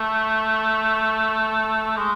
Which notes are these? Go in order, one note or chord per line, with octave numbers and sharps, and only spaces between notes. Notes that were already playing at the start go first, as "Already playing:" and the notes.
Already playing: A3
G#3